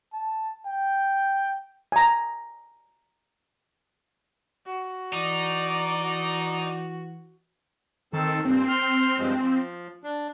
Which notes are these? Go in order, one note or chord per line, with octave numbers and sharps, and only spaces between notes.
A5
G5
G#5 A#5
F#4
E3 D#4 D5
F#4
D#3 C4 A4 A5
G2 A#2 C4
C6 F6
G2 F3 G#3
F3
D4